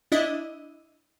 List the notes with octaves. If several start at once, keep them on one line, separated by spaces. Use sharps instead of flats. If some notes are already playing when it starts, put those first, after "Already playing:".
D4 E4 D#5